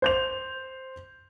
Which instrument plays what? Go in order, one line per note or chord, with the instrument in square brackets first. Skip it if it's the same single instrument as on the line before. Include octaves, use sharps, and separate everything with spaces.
[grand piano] C5 G6 F7